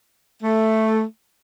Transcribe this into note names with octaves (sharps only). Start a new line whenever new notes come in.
A3